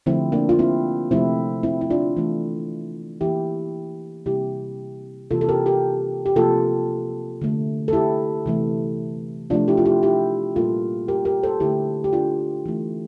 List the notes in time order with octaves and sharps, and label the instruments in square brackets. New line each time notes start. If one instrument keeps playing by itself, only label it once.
[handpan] D3 F3 A3 C4 E4
A#3 D4
F4
C4 E4
C3 F3 A3 C4 E4
C4 E4
E4
D4 F4
E3 A3
E3 A#3 E4 G4
C3 G3 A#3 E4 G4
C3 E3 A#3 F4 A4
A4
G4 A#4
G4 A#4
G4
C3 F3 A#3 F4 A4
D3 A3
A4
E4 G4
C3 E3 A3
C3 F3 A3 D4 F4
E4 G4
F4
E4 G4
E4 G4
A#2 G3 A#3 F4 A4
G4 A#4
G4 A#4
A4 C5
D3 A3 E4 G4
G4
D4 F4
E3 A3